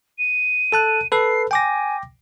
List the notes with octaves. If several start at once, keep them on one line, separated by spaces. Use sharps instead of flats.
D#7
A4 A5 F#6
A4 B4 C7
G5 G#5 D6 A#6